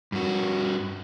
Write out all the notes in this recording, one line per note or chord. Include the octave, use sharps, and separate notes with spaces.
G2 F#4